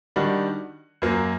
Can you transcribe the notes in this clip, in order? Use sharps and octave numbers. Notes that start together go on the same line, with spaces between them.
D#3 G3 D4 F#4
F#2 F#3 A#3